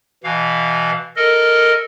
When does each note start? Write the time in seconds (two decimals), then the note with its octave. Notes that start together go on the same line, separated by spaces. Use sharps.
0.24 B2 E3 F5
1.16 A4 A#4 D#5